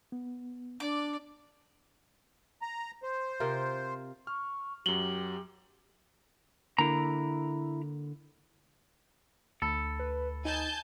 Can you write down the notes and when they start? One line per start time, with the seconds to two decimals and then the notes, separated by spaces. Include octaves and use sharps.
0.12 B3
0.80 D4 D5 D6
2.62 A#5
3.03 C5
3.40 C3 F4 A#4
4.27 C#6 F6
4.86 F#2 F#3 G4 F#7 G7
6.79 D3 A#3 E4 A#5
9.62 D2 A4 B5 A6
9.99 B4
10.45 D#4 G#5 A5 G6